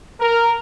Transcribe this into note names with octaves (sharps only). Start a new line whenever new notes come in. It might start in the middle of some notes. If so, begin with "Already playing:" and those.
A#4